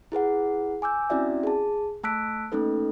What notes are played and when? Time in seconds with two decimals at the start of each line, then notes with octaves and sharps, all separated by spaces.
0.12 E4 G#4 B4 F#5
0.82 G#5 D6 E6 G6
1.10 C4 C#4 E4 F#4 D5 E5
1.43 G#4 A5
2.04 A3 A5 E6 F#6 B6 D7
2.52 A3 A#3 C#4 D#4 A4 B4